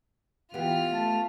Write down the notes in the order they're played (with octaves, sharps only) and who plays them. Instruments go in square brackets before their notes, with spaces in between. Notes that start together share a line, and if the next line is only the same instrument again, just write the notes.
[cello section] E3 [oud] B3 G4 [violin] F4 F6
[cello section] A3 [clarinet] A5